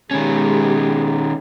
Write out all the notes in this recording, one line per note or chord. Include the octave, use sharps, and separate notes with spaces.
D#3 G#3 B3 C#4 G4